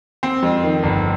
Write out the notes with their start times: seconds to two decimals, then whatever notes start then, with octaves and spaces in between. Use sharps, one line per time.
0.23 C4
0.43 F2
0.63 D#3
0.83 G1